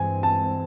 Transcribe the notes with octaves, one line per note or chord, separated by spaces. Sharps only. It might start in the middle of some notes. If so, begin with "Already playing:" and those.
Already playing: G2 E3 G#3 C4 G#5
A5